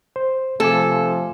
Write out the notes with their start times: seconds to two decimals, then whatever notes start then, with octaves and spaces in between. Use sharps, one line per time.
0.16 C5
0.60 C3 F3 A3 A4 G#5 D6